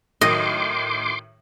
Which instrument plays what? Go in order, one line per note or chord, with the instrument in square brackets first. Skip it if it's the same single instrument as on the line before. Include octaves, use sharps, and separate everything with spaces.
[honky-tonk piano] A2 D#3 F#3 [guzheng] D#5 [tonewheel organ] C6 D6